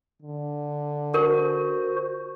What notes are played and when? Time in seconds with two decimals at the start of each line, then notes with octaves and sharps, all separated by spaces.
0.22 D3
1.14 F#4 A#4 C5